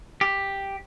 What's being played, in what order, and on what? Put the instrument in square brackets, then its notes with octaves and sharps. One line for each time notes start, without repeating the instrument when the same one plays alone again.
[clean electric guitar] G4